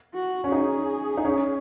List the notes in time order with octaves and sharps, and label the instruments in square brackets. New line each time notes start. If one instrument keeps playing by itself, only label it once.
[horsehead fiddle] F#4
[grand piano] C#4
[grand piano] D#4 [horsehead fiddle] G#4
[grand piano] D#4
C#4